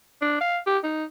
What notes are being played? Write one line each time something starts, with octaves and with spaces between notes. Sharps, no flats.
D4
F5
G4
D#4